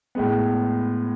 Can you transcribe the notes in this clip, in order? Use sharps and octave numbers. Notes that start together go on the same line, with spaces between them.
A2 G#3 B3